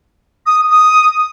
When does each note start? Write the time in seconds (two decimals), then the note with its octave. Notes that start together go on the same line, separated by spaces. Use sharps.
0.46 D#6
0.70 D#6